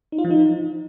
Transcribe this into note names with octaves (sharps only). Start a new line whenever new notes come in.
D#4
F4
F3
D#4